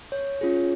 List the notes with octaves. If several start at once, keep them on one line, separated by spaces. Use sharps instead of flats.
C#5
C#4 F4 G#4